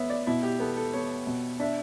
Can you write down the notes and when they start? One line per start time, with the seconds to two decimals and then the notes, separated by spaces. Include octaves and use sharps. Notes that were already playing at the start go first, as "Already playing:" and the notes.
Already playing: B3 C#5 E5
0.10 D5
0.27 B2 E4
0.43 G4
0.60 B3 A4
0.77 A4
0.94 B3 C#5
1.27 B2
1.60 D4 E5